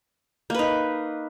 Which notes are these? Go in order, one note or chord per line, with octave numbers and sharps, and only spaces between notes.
A#3 D#4 B4